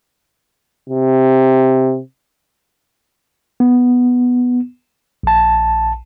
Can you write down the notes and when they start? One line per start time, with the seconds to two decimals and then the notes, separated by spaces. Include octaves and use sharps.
0.89 C3
3.60 B3
5.23 A#1 A5